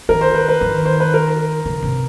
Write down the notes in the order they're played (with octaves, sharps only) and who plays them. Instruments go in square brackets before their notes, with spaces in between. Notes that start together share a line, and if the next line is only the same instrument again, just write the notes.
[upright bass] D#3 [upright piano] A#4
[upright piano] C5
B4
B4
[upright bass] D#3
[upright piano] C5
B4
A#4
[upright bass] C#3
C3